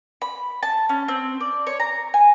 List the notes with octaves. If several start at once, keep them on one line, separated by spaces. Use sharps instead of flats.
B5
A5
C#4
C4
D5
C#5
A#5
G#5